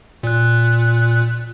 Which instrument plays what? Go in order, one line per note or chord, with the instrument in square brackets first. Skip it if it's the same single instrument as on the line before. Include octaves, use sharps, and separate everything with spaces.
[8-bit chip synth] A#2 F#6